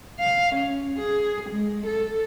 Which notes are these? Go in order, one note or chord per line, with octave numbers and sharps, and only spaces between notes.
F5
C#4
G#4
G#3
A4